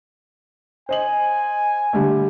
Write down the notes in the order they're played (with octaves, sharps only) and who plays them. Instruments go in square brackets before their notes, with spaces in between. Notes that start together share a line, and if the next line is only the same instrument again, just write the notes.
[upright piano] C5 D#5 F#7 [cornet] G#5
[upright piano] D3 G3 A3